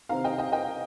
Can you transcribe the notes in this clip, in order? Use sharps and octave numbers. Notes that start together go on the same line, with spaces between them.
C3 D#3 C4 D#4 F5 A#5
D#5 G5
D#5 G5
D#5 G5